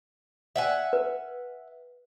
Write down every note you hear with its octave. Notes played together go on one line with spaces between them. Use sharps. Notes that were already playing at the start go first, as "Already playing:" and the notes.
E5 F#5 G#5
B4